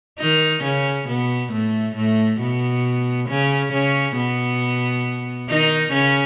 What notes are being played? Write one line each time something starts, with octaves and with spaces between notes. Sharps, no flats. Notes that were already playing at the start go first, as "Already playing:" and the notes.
D#3 D#4
C#3 C#4
B2 B3
A2 A3
A2 A3
B2 B3
C#3 C#4
C#3 C#4
B2 B3
D#3 D#4
C#3 C#4